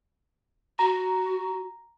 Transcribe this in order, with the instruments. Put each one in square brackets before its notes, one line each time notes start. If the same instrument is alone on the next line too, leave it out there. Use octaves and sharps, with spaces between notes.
[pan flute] F#4 [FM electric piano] A#5